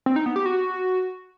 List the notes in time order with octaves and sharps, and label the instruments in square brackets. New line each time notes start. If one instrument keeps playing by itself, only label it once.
[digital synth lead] C4
D#4
B3
G4
F#4